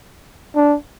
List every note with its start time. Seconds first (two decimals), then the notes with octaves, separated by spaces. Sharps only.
0.55 D4